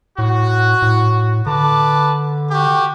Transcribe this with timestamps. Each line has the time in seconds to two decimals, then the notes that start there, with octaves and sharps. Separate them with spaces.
0.19 A2 F#4
0.82 A2
1.46 D3 B4 A5 D6
2.51 F#4 G4